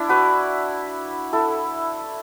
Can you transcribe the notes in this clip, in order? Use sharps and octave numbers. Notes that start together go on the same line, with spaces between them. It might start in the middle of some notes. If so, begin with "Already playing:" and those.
Already playing: D4 E4
F#4 B4
E4 A4